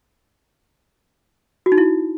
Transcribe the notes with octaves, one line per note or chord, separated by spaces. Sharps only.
F#4
D#4
E4